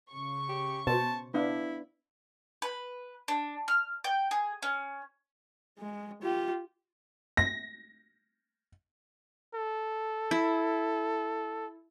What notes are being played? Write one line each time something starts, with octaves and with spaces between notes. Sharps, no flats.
C#3 C#6
G4
B2 C5 A5
B3 D4 E4 F5
B4
D4
F6
G5
G#4
C#4
G#3
F4 G4
A#6
A4
E4